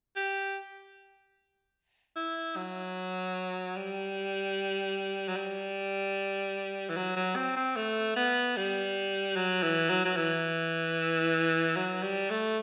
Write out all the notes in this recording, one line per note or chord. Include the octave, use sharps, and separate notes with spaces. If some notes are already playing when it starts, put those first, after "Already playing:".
G4
E4
F#3
G3
F#3
G3
E3
F#3
F#3
C4
C4
A3
B3
G3
F#3
E3
F#3
F#3
E3
F#3
G3
A3